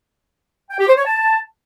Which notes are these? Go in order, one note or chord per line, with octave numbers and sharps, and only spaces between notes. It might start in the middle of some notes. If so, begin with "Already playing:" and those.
G5
G4
C5
C#5
A5